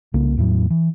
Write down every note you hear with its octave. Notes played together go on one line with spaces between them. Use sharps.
C2 C#3 A#3
E2 A2 F3 F#3
E3